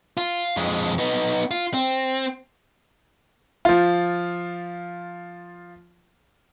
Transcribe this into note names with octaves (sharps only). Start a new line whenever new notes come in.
F4
F2 G#3
B3 D#4
F4
C4
F3 F4